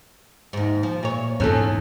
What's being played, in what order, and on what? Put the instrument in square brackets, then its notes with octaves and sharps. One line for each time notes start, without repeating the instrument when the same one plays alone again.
[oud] D#2 G#2
F3
A#2 C#5
[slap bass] E2 G#2 [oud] C#4 F4 A4